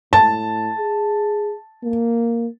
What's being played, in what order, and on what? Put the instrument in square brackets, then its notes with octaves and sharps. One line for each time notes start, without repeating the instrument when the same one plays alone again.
[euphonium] A2 [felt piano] A5
[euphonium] G#4
A#3